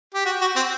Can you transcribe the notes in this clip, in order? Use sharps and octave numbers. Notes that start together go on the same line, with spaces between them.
G4
F#4
F#4
C4